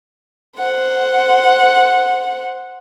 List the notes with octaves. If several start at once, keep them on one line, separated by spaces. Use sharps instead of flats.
C5 F#5